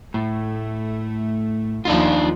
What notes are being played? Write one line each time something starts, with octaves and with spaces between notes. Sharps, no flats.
A2 A3
D#2 F3 D4 D#4 F4